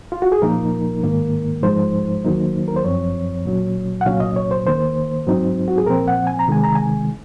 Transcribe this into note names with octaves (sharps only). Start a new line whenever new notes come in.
F4
F#4
G#4
A#2 F3 A#3 D#4 A#4
G#2 D#3 A#3
G#2 F3 G#3 D#4 C5
D#2 D#3 F#3 A#3 D#4
A#4
C5
F#2 F3 C4 C#5
A#2 F#3 C#4
F#5
C2 A#2 F#3 C#4 F5
D#5
C#5
C5
D#2 D#3 A#3 C5
G#2 F#3 C4 D#4
F#4
G#4
A#2 F3 C4 A#4
F#5
G#5
A#5
C3 D#3 G#3 G#5
A#5
G#5